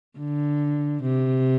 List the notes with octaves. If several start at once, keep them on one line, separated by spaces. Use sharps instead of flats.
D3
C3